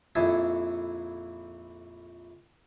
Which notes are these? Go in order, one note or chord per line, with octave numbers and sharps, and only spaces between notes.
A#1 F2 E4 G#4 A4 E5